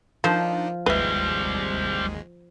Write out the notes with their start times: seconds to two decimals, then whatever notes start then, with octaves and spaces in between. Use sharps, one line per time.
0.24 D#3 F3 D4 D#4 C5
0.86 G#1 D#2 G3 G#3 C4 B4 E5